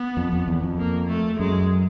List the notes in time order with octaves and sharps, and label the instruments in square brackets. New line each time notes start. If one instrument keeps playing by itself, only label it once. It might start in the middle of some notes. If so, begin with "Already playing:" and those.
Already playing: [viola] B3
[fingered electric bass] F2
F2
E2
F2
[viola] A#3
A3
[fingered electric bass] F#2 [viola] G#3